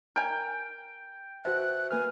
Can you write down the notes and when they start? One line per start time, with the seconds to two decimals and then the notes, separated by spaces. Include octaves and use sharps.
0.16 A#4 G5 G#5
1.45 B2 F#4 C5 E5 F#6
1.91 A#3 B4 G#5 F6